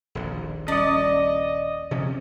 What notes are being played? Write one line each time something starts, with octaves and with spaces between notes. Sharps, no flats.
D#1 A#1 A#2
G3 C#4 D5 D#5
C3 F3 C#4